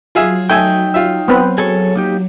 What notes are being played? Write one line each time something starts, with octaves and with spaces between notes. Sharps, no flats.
F#3 F4 G#4 E5
A3 D#4 G5 G#5 E6
F4 E5
B3 C4 B4
G#4 A4 C#5
A#3 D#4 G4